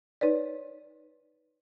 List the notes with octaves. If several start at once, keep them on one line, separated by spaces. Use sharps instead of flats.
D#4 B4 C#5 D5